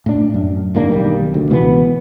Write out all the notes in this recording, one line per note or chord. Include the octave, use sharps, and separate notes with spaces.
A2 D4
F#2
D1 G#2 A#3 D4
B1 D#3 G3
D2
C#2 B2 E3 B3